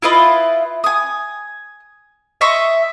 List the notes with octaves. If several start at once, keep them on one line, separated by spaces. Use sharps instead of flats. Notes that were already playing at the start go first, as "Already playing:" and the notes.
E4 F4 B4 D#5
G#5 D#6
D#5 E5 C6 C#6